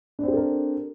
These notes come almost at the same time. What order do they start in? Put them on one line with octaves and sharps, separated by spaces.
D4 C4 G4 A4 A#4